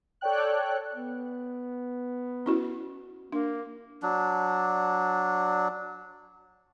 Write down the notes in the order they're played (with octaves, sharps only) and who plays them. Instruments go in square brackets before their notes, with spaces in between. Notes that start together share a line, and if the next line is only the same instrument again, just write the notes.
[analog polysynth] A4 C#5 D5 G5 F#6
[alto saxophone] B3
[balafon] C#4 E4 F#4
[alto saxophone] A#3 [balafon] D4
[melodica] F#3 D4